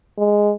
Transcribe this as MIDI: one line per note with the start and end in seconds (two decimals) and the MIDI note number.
0.18 0.53 56